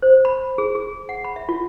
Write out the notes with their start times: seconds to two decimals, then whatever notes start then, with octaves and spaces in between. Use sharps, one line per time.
0.02 C5
0.25 B5
0.58 G#4
0.75 G#4
1.09 F#5
1.24 B5
1.36 E5
1.49 F4